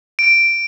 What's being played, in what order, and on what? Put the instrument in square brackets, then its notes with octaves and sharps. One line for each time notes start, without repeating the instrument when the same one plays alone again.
[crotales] D7